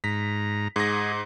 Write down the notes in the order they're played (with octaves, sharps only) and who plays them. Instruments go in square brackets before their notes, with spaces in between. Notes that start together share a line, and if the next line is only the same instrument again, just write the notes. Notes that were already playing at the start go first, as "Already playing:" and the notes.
[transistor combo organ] G#2 A#5 [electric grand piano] B6
[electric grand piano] G#2 A#6 [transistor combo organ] G#4